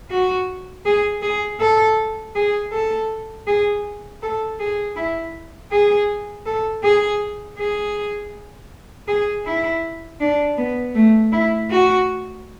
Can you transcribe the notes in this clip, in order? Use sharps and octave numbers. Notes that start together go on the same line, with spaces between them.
F#4
G#4
G#4
A4
G#4
A4
G#4
A4
G#4
E4
G#4
A4
G#4
G#4
G#4
E4
D4
B3
A3
E4
F#4